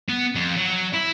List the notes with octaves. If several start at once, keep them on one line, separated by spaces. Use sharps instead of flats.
B3
F2
F#3
E4